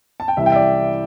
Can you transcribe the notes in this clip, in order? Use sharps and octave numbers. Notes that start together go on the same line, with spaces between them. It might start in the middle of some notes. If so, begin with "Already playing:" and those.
A5
G5
C2 C3 E3 E5
G5
E5
D5